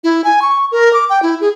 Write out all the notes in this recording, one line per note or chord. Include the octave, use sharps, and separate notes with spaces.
E4
G#5
C#6
A#4
D6
G5
E4
G#4